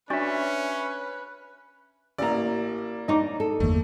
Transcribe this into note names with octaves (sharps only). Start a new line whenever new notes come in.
C#4 D4 F#4 B4 D5 E5 C#6
A1 A#3 E4 D5 A#5
D4 D#4 D#5 A#5 D6
A4
G1 E2 A3 A#3